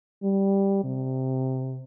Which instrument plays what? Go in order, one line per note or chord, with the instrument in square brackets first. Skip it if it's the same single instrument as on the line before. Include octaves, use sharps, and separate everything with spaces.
[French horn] G3
C3